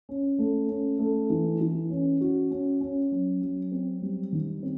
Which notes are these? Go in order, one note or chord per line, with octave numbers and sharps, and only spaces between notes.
C#4
A3
C#4
A3
E3
E3
C#4
F#4
C#4
C#4
F#3
F#3
C4
G3
D#3
C4